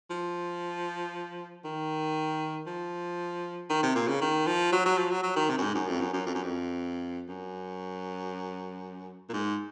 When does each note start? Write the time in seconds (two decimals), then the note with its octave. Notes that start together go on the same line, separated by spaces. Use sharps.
0.10 F3
1.65 D#3
2.67 F3
3.70 D#3
3.83 C3
3.95 A#2
4.08 C#3
4.21 D#3
4.46 F3
4.72 F#3
4.86 F#3
4.97 F3
5.11 F#3
5.23 F#3
5.36 D#3
5.49 C3
5.58 F#2
5.62 G#2
5.75 F#2
5.88 F2
6.00 F#2
6.13 F#2
6.26 F2
6.35 F#2
6.43 F2
7.28 F#2
9.29 A#2
9.33 G#2